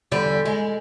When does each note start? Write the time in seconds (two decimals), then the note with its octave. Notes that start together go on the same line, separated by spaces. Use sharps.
0.11 E2 D3 G3
0.45 G#3